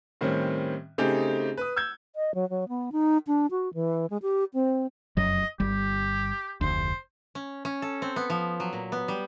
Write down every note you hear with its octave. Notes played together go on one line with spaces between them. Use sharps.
A2 D#3 G3 C4 C#4
C#3 A3 C4 D#4 G4 G#4
B4 D#6
E6 G6 G#6
D#5
F#3
F#3
B3
D#4
D4
F#4
E3
G#3
G4
C4
F1 F#2 F#3 D#5
G1 G3 G4
F1 D2 C5
C#4
C#4
A4
C4
B3
F3
F#3
A#2
B3
G3